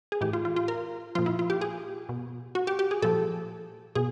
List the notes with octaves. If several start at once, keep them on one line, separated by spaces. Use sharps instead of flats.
G#4
A2 E3 G4
F4
F4
F4
A#4
A#2 F3 F4
E4
F4
G4
G#4
B2
F#4
G4
G4
G#4
A#2 F3 A4
B2 G#4